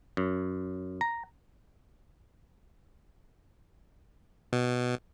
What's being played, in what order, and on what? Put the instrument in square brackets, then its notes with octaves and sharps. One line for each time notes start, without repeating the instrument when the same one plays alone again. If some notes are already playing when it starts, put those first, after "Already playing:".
[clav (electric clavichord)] F#2
A#5
[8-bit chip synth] B2